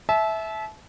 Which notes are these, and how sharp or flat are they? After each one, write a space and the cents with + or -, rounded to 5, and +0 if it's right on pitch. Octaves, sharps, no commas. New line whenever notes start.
E5 -10 A5 -35